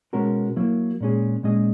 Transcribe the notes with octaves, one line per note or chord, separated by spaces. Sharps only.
B2 G#3 C#4 F#4 A#4
F#3 A#3 E4
A#2 G#3 C#4 G#4
A#2 G#3 C#4 G#4 D#5